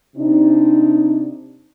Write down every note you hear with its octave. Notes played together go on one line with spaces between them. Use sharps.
C3 C4 D4 D#4